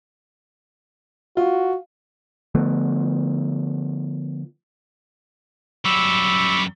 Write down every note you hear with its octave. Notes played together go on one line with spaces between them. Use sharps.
F4 F#4
D3 F3 A3 B3
F#2 G3 B5 C#6 D6 E6